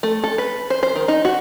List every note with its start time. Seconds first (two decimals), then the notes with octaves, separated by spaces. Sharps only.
0.03 A3
0.24 A4
0.38 B4
0.70 C5
0.83 C5
0.96 D#3
1.08 D#4
1.25 F#4